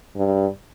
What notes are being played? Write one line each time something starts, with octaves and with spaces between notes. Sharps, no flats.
G2